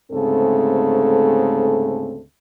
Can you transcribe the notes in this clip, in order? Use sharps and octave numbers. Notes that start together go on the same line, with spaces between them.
D2 G#2 C#3 A3 C4 A4